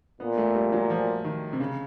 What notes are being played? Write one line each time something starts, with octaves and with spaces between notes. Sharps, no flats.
A#2 B3
A3
G3
F#3
F3
D#3
C3
C#3